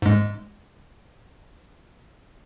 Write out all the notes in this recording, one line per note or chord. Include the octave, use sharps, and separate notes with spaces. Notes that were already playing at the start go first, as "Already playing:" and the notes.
G#2 G#3